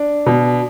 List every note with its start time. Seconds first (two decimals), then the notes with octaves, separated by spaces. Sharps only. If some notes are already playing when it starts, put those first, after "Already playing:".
Already playing: D4
0.26 B2